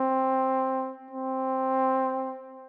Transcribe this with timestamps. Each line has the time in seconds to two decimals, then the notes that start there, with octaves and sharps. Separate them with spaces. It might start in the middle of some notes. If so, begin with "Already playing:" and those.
Already playing: C4
1.11 C4